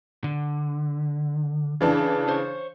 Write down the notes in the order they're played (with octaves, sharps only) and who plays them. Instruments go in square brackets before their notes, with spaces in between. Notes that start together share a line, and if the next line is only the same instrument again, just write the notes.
[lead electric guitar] D3
[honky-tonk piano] C#3 E3 D4
[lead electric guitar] C5 C#5